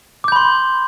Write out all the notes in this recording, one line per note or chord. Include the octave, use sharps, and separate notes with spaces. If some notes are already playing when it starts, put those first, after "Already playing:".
B5 C6 D6 G6